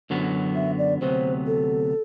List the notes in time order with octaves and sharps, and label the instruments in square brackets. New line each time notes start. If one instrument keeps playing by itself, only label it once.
[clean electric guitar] F#2 D3 F#3 B3
[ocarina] E5
D5
[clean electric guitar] D2 C3 F#3 B3 [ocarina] C5
[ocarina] A4